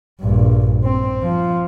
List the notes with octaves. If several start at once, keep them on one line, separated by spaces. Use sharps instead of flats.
A#1 G2
C4
F3